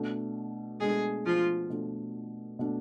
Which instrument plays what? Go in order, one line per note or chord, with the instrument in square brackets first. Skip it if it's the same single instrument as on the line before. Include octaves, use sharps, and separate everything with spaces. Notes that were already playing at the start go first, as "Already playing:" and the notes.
Already playing: [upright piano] B2 A3 D4
[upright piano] B2 A3 D4 [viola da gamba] G#3 G#4
[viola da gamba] F3 F4
[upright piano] B2 A3 D4
B2 A3 D4